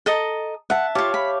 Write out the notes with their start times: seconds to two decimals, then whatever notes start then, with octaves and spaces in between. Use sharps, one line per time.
0.06 A4 D#5 A#5
0.70 E5 F#5 A5
0.95 F4 G4 C#5 F5 A5
1.14 B5